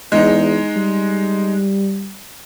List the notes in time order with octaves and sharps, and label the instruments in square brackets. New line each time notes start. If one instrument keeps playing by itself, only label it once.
[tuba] E2 [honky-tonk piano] G#3 D#4
[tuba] G3